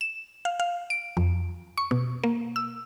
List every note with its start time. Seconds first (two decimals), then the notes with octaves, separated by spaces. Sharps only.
0.01 E7
0.45 F5
0.60 F5
0.90 D7
1.17 F2
1.78 C#6
1.91 B2
2.24 A#3
2.56 E6